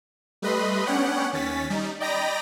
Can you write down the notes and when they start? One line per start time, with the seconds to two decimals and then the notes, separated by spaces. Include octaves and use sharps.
0.42 G3 A3 B4 D#5 B5 C6
0.86 B3 C#4 D4 C#5 F#5 G5
1.33 D#2 C#4 A6 B6
1.70 G3 D#4
2.00 D5 D#5 G5 A#5 B5 A#6